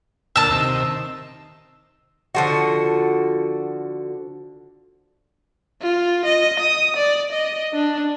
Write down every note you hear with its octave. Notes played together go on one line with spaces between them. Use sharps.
D2 A#2 A5 E6 F6
C3 D#3
D3 F3 F#4
F4
D#5
D#6
D5
D#5
D4